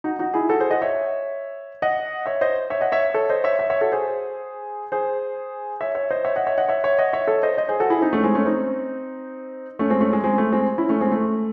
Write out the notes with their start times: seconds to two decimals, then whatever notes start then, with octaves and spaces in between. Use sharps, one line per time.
0.04 D#4 F#4
0.19 D#4 F#4
0.34 E4 G#4
0.49 F#4 A4
0.60 G#4 C5
0.71 D#5 F#5
0.82 C#5 E5
1.82 D#5 F#5
2.26 C#5 E5
2.41 C5 D#5
2.70 C#5 E5
2.81 D#5 F#5
2.92 C#5 E5
3.14 A4 C#5
3.30 C5 D#5
3.44 C#5 E5
3.59 C#5 E5
3.70 C#5 E5
3.81 F#4 A4
3.92 G#4 C5
4.92 G#4 C5
5.81 C#5 E5
5.95 C#5 E5
6.11 C5 D#5
6.25 C#5 E5
6.36 D#5 F#5
6.47 C#5 E5
6.58 D#5 F#5
6.68 C#5 E5
6.84 C#5 E5
6.99 D#5 F#5
7.13 C#5 E5
7.27 A4 C#5
7.43 C5 D#5
7.57 C5 D#5
7.68 G#4 C5
7.80 F#4 A4
7.90 E4 G#4
8.01 C4 D#4
8.13 A3 C#4
8.24 G#3 C4
8.35 A3 C#4
8.46 C4 D#4
9.79 A3 C#4
9.90 G#3 C4
10.01 A3 C#4
10.13 G#3
10.24 G#3 C4
10.38 A3
10.52 G#3 C4
10.78 C#4 E4
10.89 A3 C#4
11.01 G#3 C4
11.12 A3